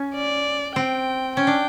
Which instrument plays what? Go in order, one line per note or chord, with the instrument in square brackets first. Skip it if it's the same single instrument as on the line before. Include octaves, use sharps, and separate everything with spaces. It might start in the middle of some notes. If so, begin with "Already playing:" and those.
Already playing: [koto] C#4
[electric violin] D5
[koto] C4 [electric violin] G5
[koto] C#4 [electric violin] G5
[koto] D4